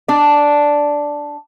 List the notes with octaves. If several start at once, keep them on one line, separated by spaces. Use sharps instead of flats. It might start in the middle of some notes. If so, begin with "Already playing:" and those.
D4 D5